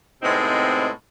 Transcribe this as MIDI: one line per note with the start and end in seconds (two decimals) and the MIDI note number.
0.23 0.89 45
0.23 0.89 48
0.23 0.89 56
0.23 0.89 59
0.23 0.89 60
0.23 0.89 63